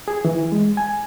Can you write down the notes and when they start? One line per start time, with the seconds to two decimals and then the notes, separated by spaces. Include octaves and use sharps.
0.08 G#4
0.25 E3
0.52 G#3
0.77 G#5